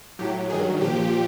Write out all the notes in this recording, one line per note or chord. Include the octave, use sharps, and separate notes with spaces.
A2 F#3 G4
G2 D#3 F#3 G#4
A#2 F3 G4